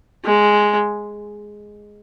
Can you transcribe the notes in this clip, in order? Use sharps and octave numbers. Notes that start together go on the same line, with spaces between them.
G#3